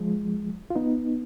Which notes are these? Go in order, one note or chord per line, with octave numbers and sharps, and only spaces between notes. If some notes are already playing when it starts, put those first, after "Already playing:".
Already playing: F3 G#3
F4
B3 D#4